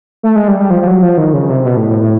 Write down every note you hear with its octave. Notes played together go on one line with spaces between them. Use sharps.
A3
G#3
G3
G3
F3
F3
F#3
F3
D#3
C#3
C3
B2
A2
A2
A2